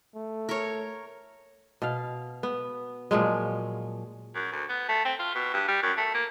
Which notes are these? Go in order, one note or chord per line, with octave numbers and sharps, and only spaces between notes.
A3
A#4 C#5
B2 F5
B3
A#2 F3 F#3 G#3
F#2
D2
B3
A3
C4
F4
B2
G2
G3
F#2
A3
A#3